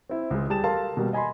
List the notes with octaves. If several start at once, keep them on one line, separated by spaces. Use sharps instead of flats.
C4 E4
C#2 G#3
G3 G4 G#4 A5 A6 E7
G4 A4 A#4 F5 A5 C6
B2 G3 A#3 G4
D#5 G#5 B5 C6